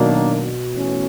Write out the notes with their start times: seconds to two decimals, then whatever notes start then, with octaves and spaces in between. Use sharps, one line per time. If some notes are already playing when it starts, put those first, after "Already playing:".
Already playing: B2 D#3 F#3 A#3 D4
0.75 E3 A3 C#4